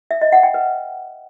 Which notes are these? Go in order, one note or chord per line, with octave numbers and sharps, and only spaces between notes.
E5
D#5
F#5
G5
B4